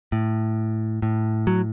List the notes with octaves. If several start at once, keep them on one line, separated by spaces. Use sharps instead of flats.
A2
A2
F#3